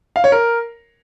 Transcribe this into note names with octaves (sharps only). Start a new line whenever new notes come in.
F5
C#5
A#4